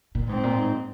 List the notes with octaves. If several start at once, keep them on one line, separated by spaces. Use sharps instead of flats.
A#2
G#2 C4
A#2
G#2